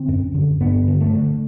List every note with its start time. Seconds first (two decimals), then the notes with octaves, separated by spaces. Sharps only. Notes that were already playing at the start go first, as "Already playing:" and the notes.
Already playing: D3 C4
0.08 F#2
0.34 D3
0.60 G2 B3
0.88 D3
1.01 A3
1.14 D3